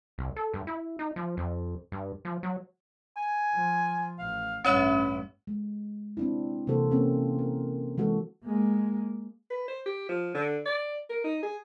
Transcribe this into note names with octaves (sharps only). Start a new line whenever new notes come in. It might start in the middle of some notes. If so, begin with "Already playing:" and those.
C2
A4
G2
E4
D#4
F3
F2
G2
F3
F#3
G#5
F3
A1 F5
A1 G2 C#4 E4 C#5 E5
G#3
C4 D4 E4
C3 E3 A#3 F#4 A4 C5
A#3 C4 C#4
A#4
E3 G#3 F#4 A4
G#3 A#3
B4
C5
G4
F3
D3
D5
A#4
D#4
G#4